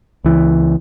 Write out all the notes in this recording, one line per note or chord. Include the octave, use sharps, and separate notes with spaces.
C#2 E3